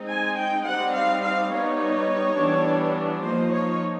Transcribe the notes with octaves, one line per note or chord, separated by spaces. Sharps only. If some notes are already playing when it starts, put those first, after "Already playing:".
Already playing: G#3 C4 D#4
G#5
G5
G3 C4 D#4 F#5
F5
F5
G3 B3 D#4 C#5
E3 G3 B3 D4
F3 A#3 D#4 C5
C#5